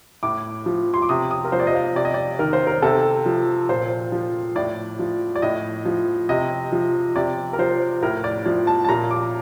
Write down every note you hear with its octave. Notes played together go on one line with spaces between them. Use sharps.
A2 D6
F3
C6
D6
C3 D#6
D#6
A#4
F3 C5
D5
D#5
F5
C3 D5
D#5
D5
D#3 A#4
C5
A#4
C3 A4
F3
A#2 C5
F3
A2 D5
F3
D5
A2 D#5
F3
C3 D#5
F3
C3 D5
A#4
F3 C5
A2 A#4
D5
F3 D5
A5
A5
A#2 A#5
D6